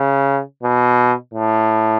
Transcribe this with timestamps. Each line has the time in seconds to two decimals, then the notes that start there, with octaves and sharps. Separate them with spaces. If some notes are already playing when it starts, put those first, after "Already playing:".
Already playing: C#3
0.63 B2
1.34 A2